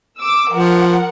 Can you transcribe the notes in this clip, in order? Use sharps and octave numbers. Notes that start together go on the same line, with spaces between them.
D6 E6
F3 A#4 F#5